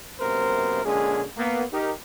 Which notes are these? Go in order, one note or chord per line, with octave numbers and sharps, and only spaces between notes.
F#2 C3 A#3 B3 A#4 C5
A#2 D3 G#3 C#4 G#4
A#3 B3
D#4 G4 A#4